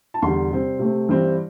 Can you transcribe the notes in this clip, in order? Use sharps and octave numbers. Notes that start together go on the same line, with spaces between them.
A5
E2 D3 G3 C6
C3 G3 C4
C3 A3 C4
G2 E3 G3 C4